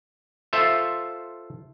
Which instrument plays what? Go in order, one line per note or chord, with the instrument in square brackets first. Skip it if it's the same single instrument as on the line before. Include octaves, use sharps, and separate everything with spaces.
[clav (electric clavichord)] F4 A4 C5 E5 F5